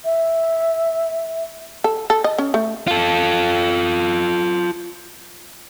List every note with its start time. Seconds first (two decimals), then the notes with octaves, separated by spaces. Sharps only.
0.05 E5
1.84 A4
2.10 A4
2.24 D#5
2.38 C#4
2.54 A3
2.87 F4 A4